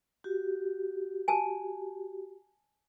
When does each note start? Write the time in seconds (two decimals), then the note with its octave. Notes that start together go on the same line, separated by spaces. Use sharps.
0.24 F#4 G4
1.28 G#5 A5